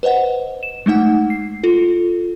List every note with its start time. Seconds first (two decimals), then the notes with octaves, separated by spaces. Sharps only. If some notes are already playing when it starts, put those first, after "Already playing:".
0.03 B4 C5 D#5 F#5
0.63 E7
0.86 G#3 A3 D#4 F#5
1.30 C7
1.63 F4 A4